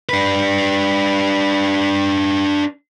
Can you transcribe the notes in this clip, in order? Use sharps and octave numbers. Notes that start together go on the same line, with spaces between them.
D4 B4